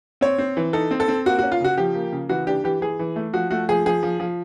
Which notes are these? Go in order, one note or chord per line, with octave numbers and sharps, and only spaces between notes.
C4 C#5
C4
E3
D#4 A4
C4
A4
C4
A#3 F#4
F#4
C#4
F4
C#3 F#4
F3 G4
A#3
C#3
E3 F#4
D4 G4
E3 G4
E3 G#4
E3
A3
F3 F#4
A3 F#4
F3 G#4
F3 G#4
F3
F3